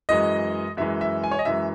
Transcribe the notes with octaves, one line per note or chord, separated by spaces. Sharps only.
F#2 E3 G#3 D#5
F#2 E3 G#3 E5
E5
G#5
C#5
D#5
F#2 E3 G#3 E5